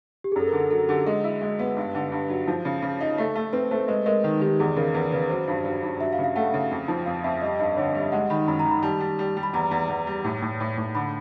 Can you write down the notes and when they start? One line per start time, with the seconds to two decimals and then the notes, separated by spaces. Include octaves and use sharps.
0.24 G4
0.32 G#4
0.36 F#2 A4
0.48 A#4
0.53 D3
0.60 A4
0.70 F#3 A4
0.88 D3 G4
1.06 G#3 G#4
1.24 E4
1.41 G#3
1.59 B3
1.77 G2
1.95 D3
2.12 G2
2.30 F#3
2.47 F3
2.65 C#3
2.82 C#3
3.01 D#4
3.18 A3
3.35 A3
3.53 C4 B4
3.71 A3 C5
3.88 G#3 B4
4.06 G#3 A#4
4.24 D#3
4.41 D#3 G4
4.60 E2 G#4
4.76 C#3 A#4
4.94 E2 B4
5.12 C#3 B4
5.30 F#3 C5
5.47 G2
5.65 F#3
5.83 G2
6.01 F#3 E5
6.13 F5
6.18 C#3
6.24 F5
6.36 A3 F#5
6.54 C#3
6.71 F2
6.88 F3
7.06 F2 F5
7.24 F2 E5
7.42 G3 D#5
7.59 G2 D#5
7.77 D3 C#5
7.89 D#5
7.95 G3
8.01 E5
8.12 G#3 F#5
8.30 D#3 B5
8.48 F#2 B5
8.59 A#5
8.66 D#3
8.71 B5
8.83 G3 A5
9.00 G3
9.19 G3
9.37 G3
9.43 B5
9.53 E2 A#5
9.71 E2
9.89 E2
10.07 G3
10.24 A2
10.42 A2
10.60 A2
10.77 A2
10.95 D3 B5